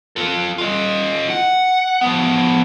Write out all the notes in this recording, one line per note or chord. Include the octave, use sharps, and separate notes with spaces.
F4 A4
F4 D#5
F#5
F3 B3